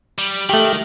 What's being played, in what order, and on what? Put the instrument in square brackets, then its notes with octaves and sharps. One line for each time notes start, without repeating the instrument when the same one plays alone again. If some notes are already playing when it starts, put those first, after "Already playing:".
[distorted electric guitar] G3
[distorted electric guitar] D#3 [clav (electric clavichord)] A3 G4